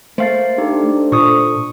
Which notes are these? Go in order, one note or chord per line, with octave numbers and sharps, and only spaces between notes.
A3 A#3 C5 F5 A6
D4 D#4 G4 A4 C5
A#2 C#6 D#6